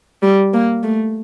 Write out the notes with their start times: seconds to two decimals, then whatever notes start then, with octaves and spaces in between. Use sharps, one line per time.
0.22 G3
0.53 A#3
0.83 A3